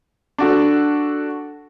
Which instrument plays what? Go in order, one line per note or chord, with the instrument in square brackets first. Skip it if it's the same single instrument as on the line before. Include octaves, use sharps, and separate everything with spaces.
[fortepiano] D4 F#4 A4